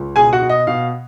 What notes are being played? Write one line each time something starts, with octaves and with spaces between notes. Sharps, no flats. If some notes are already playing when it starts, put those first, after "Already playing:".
Already playing: C#2
B2 G#4 G#5
F#4 F#5
B2
D#5
B2 F5